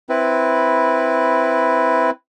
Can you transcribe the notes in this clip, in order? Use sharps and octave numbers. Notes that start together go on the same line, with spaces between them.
C4 E4 B4